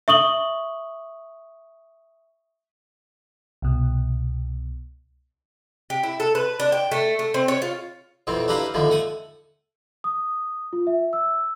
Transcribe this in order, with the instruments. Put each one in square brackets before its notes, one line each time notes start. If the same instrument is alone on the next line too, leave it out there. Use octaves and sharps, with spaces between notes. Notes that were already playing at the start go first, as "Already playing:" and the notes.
[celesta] E5 C#6 D#6 F#7 G7
[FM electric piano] C2 B2
[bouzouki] G4
E4
A4
B4
D4
G5
A3
A3
C4
C#5
F4
[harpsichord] F2 B2 E3 C4
D4 E4 G4 A#4 B4 F5
D#2 A2 D3 F3 A#3
A3 F#5 G#5
[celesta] D#6
F4
E5
E6